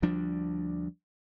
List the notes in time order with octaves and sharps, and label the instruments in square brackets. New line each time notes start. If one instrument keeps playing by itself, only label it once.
[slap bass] D2 F3 G3 D4